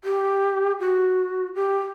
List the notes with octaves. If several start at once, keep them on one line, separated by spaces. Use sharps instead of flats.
G4
F#4
G4